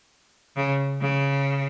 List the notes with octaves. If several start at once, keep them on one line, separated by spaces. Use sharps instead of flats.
C#3
C#3